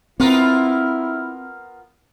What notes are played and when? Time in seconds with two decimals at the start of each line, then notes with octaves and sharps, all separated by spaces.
0.20 B3 C4 E4 F4 A#4